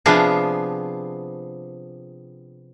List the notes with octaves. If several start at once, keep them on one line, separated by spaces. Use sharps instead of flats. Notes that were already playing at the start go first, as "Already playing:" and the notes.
C3 F3 B3 D4 F4 G#4